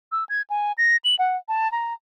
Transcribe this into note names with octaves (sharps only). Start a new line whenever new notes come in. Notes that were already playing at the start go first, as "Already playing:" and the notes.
E6
G#6
G#5
A#6
F#7
F#5
A5
A#5